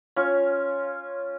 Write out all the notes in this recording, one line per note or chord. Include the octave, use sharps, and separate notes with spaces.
C#4 F4 C#5